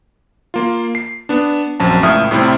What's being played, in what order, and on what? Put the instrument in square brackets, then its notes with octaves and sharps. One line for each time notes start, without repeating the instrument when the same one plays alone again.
[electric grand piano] A#3 F4
C7
B3 D4
A#1 F#2 C4 A5
C#2 A2 E5 D#6 F6
A2 C3 G3 C4 E4